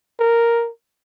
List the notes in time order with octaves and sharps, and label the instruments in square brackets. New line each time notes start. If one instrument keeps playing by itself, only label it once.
[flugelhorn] A#4